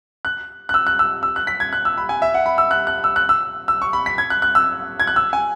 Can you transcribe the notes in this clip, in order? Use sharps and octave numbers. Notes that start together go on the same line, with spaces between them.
F#6
F#6
E6
F#6
E6
E6
F#6
B6
G#6
F#6
E6
B5
G#5
E5
F#5
B5
E6
F#6
F#6
E6
F#6
E6
E6
C#6
B5
B6
G#6
F#6
F#6
E6
G#6
F#6
E6
G#5